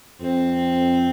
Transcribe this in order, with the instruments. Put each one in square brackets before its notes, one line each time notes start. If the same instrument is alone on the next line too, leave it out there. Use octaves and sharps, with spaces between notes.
[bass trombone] F2 [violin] C4